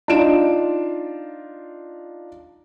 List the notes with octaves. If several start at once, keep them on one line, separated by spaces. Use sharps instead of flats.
D4 D#4 F4 D7 E7